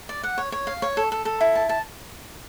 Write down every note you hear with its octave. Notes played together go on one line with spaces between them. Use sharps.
D5
F#5
C#5
C#5
F5
C#5
A4
A4
A4
E4
A5
A5